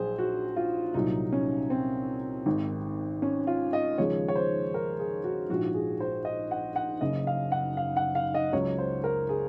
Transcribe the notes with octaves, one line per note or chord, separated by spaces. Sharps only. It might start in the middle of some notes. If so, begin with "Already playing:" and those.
Already playing: A#1 F#3 G#4 C5
F#4
F4
C2 A#2 F#3 D#4
C#4
C4
G#1 G#2 D#3
C#4
F4
D#5
D#2 C#3 F3 G#3 C#5
C#5
C5
A#4
G#4
F#4
A#1 G#2 F3 F#4
G#4
C5
D#5
F#5
F#5
F#1 F#2 C#3 D#5
F5
F#5
F5
F#5
F5
D#5
C#2 C#3 F#3 C#5
C5
A#4
G#4